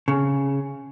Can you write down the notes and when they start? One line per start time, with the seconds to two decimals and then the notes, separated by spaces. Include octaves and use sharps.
0.08 C#3